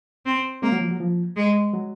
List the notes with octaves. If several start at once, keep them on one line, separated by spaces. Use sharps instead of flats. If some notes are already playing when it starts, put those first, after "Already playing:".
C4
G#3 A#3 C4
F#3
F3
F#3
F3
G#3
F#3